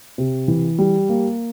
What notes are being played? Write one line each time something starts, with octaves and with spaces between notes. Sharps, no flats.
C3
E3
G3
A#3